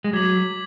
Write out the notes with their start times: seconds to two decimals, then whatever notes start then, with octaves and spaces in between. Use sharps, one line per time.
0.04 G#3
0.13 F#3 D6 G#6 B6 F#7